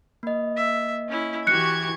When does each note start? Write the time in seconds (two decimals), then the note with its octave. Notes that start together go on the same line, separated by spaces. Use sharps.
0.23 A#3 D#5
0.56 E5
1.08 C#4 E4
1.47 E3 F#4 G4 C#6 F#6 G#6 C#7